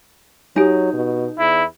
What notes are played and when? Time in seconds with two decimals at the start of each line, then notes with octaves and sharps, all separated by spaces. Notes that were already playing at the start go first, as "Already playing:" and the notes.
0.56 F#3 D#4 G4 G#5
0.93 B2
1.39 E2 E4